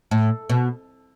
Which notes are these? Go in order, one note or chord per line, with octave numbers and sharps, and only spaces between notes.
A2
B2